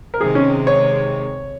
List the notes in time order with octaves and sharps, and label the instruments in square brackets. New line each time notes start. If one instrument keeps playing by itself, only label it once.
[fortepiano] A#4
[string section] C3 D#3 G#3 [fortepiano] G#4
[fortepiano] C#4
C#5